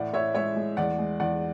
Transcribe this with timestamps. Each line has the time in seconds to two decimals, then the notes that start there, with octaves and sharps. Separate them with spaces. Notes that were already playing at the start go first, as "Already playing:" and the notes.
Already playing: A2 E3 D5 F#5
0.13 A2 C#5 E5
0.35 G#3 C#5 E5
0.56 G#3
0.77 E2 D5 F#5
0.99 G#3
1.20 E2 D5 F#5